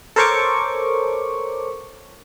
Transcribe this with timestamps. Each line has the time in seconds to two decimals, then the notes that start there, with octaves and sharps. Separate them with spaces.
0.16 A4 A#4 C5 C#5 C#6 D6